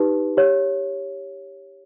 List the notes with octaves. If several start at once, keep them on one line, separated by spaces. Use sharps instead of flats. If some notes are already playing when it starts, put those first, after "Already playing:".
Already playing: D#4 G4 B4
G4 C#5